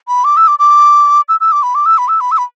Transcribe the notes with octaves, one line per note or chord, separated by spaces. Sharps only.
B5
D6
E6
D6
D6
E6
E6
D6
B5
D6
E6
B5
E6
B5
E6
B5